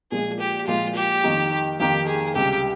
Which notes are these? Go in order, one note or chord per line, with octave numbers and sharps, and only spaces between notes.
A#2 F3 G#3 G#4
G4
A#2 F3 G#3 F4
G4
F2 D#3 A#3 D#4
F2 D#3 A#3 D#4 G4
G#4
C#2 C3 G3 G4